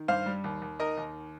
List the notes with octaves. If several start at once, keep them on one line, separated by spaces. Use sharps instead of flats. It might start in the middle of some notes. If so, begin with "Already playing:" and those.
Already playing: D#3
G2 C5 F5
G3
D#2
D#2
D#3 A#4 D#5
D#2